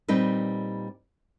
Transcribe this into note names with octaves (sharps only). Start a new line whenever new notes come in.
A#2 G3 C4 D#4 B4